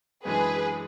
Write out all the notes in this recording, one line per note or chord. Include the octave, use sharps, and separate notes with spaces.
F#2 E3 G#3 D4 G#4 B4